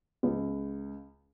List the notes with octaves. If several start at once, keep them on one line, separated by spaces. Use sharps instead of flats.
C#2